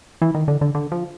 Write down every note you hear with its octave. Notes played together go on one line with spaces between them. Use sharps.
E3
D#3
D3
D3
D3
F3